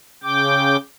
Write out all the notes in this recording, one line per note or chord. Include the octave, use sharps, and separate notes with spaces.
C#3 G5 D6